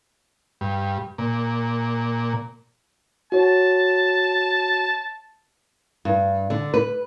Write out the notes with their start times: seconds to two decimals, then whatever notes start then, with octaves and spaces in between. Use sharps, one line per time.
0.61 G2
1.18 A#2
3.32 F#4 C#5 A5
6.05 G2
6.50 D3
6.74 B4